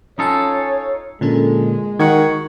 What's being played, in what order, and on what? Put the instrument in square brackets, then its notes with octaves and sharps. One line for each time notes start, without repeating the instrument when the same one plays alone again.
[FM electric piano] C#4 G#5 [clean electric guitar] D#4 F4 A4 [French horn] C#5
[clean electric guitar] A#2 [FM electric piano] D3 C#4 A4 [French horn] G#3
[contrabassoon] D#3 [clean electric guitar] F#4 F#5 [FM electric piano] G#6